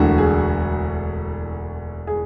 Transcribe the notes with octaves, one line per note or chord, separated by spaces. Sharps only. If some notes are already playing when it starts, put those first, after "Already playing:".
Already playing: E1 D2 D3 F#4
G#4
G#4